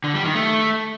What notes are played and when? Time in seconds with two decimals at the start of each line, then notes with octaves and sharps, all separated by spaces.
0.04 D3
0.14 G3
0.25 D#3
0.35 A3